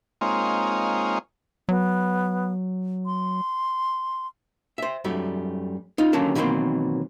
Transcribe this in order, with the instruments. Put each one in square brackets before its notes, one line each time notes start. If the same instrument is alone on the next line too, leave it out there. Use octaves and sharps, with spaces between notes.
[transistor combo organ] G#3 A#3 C4 D#4 F4 C#5
[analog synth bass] F#3 [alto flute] B3
[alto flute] C6
[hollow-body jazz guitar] C5 E5
F#2 G3 A3
D#4 F4
D#2 D3 F#3 A#3 C#4 A5
B2 D#3 E3 F#3 A#3 C4